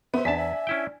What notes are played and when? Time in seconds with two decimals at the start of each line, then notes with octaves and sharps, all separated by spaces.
0.14 B3 C5 E5
0.25 E2 D4 G#5 A5 B6
0.37 E5
0.67 C#4 E4 G5